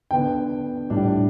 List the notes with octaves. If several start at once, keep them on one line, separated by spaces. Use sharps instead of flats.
D3 B3 D4 G5
A2 G3 D4